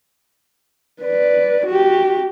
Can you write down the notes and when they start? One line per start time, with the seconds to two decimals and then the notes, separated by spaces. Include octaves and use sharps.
1.02 B4 D5
1.66 F#4 G4